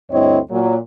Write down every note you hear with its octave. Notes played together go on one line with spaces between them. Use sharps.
D2 G2 C4 E4 C#5 D#5
A#2 F#3